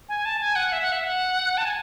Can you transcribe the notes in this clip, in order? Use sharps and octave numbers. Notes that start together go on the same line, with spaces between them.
G#5
A5
G#5
F#5
E5
F#5
E5
F#5
A5
G#5